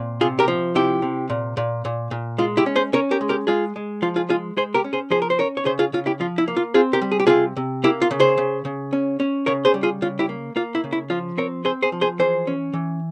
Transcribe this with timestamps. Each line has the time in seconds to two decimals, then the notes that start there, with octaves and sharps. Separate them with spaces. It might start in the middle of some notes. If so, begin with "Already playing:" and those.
Already playing: A#2 C4
0.21 C3 F4 G#4
0.39 G4 A#4
0.48 F3
0.75 C3 E4 G4
1.02 C3
1.30 A#2
1.57 A#2
1.85 A#2
2.11 A#2
2.38 G#3 F4
2.57 E4 G4
2.66 C#4
2.76 G#4 C5
2.93 C#4 A#4 C#5
3.11 G4 A#4
3.21 G#3
3.29 G4 A#4
3.47 G#3 F4 G#4
3.76 G#3
4.02 F3 F4
4.16 F4 G#4
4.29 G#3 F4 G#4
4.57 G#3 G#4 C5
4.74 G4 A#4
4.84 C#4
4.93 G#4 C5
5.10 F3 G#4 C5
5.22 A#4
5.30 C5
5.38 C#4 A#4 C#5
5.57 C#5
5.65 C#3 G#4 C5
5.79 F4 G#4
5.93 C#3 F4
6.06 E4 G4
6.20 F3 F4
6.38 E4
6.48 A#3
6.57 F4
6.74 C4 F4 G#4
6.93 G4 A#4
7.01 G3
7.12 G#4
7.20 G4
7.27 C3 F4 G#4
7.57 C3
7.84 A#3 E4 G4
8.02 F4
8.11 C#3
8.20 G#4 C5
8.38 C#3
8.65 C#3
8.93 C#4
9.20 C#4
9.46 C#3 A#4 C#5
9.65 G#4 C5
9.74 G3
9.83 F4 G#4
10.02 C#3 F4
10.19 E4 G4
10.29 A#3
10.56 A#3 F4
10.75 E4
10.84 C#3
10.93 E4
11.10 F3 F4
11.37 C4 A#4 C#5
11.65 C4 G#4 C5
11.83 G#4 C5
11.92 F3
12.01 G#4 C5
12.19 E3 G#4 C5
12.47 C#4
12.73 E3